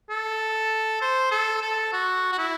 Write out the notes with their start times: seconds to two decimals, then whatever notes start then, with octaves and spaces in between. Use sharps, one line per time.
0.10 A4
1.02 C5
1.31 A4
1.62 A4
1.93 F#4
2.33 F#4
2.38 E4